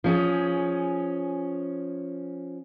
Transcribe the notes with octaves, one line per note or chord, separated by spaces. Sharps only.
F3 C#4 G#4